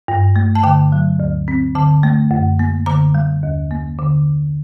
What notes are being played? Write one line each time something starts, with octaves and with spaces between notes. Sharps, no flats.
G2
A3
A5
D3 G5
F#3
D2
C4
D3 A5
A3
F#2
A#3
D3 A#5
G3
D#2
A#3
D3